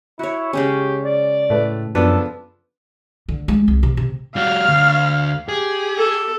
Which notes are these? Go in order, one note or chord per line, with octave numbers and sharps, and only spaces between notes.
E4 F#4 C#5
C#3 G#3 C#4 G4
D5
A2 A3 B4
F#2 F3 B3 D4 A4 B4
D3
G#3
C2
C3
C3
G3 F#4 F5 F6
D2
G4 G#4
A4